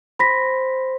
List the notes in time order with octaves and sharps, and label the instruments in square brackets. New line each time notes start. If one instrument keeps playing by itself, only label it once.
[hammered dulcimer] C5 [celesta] B5 A#6 B6